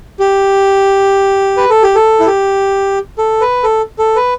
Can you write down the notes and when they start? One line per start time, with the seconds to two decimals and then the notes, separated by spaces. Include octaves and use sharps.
0.20 G4
1.57 B4
1.70 A4
1.83 G4
1.95 A4
2.20 E4
2.26 G4
3.18 A4
3.41 B4
3.63 A4
3.99 A4
4.16 B4